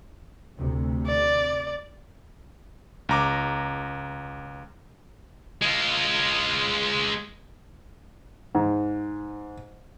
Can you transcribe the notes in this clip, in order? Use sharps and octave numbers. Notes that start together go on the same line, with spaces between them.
D2 C3
D5
C#2 A#5 D6
G#3 F4
G#2